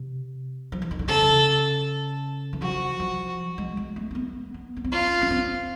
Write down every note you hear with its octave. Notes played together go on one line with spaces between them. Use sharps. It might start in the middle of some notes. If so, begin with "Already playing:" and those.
Already playing: C3
F3
E3
D#3
D3
C#3 A4
E3
F3 F#4
F3
G#3
G#3
A3
C4
B3
B3
B3
C4
C#4 F4
C#4
C4